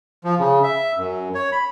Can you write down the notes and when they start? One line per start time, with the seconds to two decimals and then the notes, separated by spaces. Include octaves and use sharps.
0.24 F3
0.39 C#3
0.63 E5
0.97 F#2
1.35 C#5
1.52 B5